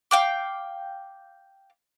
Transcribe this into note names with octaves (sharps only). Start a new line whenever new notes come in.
F5 G5 D6